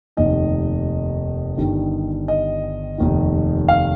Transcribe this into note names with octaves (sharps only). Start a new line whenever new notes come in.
F1 D#2 D#3 D#5
G1 G2 D#3 G3
D#5
F1 D#2 D#3
F5